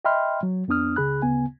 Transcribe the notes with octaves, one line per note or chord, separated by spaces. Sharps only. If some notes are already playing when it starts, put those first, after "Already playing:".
D#5 E5 G5 B5 C6 F6
F#3
F2 B3 D4 D#6 F6
C#2 C#3 G#4 B5 F#6
D2 C#3 B3 G#5